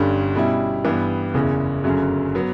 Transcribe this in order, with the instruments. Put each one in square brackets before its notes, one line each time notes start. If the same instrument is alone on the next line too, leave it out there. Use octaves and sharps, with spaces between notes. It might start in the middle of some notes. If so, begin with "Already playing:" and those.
Already playing: [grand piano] G1 G2 D3 G3 C#4
B2 G3 C#4 E4
G2 E3 G3 B3
F#1 E2 C#3 E3
G1 F#2 C#3 F#3 C#4
F#3 B3